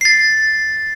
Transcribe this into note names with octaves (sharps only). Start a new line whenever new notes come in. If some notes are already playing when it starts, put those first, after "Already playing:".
A6 C7